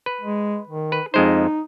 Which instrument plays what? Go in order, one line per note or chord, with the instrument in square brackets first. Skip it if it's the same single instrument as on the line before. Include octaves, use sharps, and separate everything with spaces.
[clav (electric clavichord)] B4
[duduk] G#3
D#3
[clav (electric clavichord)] B4
[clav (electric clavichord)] F2 G#3 C5 [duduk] D#4